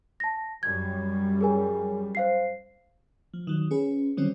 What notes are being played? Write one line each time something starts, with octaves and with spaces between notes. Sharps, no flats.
A5 A#6
F#2 G3 G#6
G#4 A#4 G#5
C5 F5 C7
F3
D#3 F#3
C#4 G#4 B4
D3 D#3 F#3 G3 C4 C#4